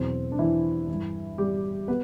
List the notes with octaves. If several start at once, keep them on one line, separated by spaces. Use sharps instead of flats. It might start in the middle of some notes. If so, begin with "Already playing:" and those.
Already playing: E2 B2 F#3 C4
D4
E3 E4
G2 E3
G3 G4
B3 B4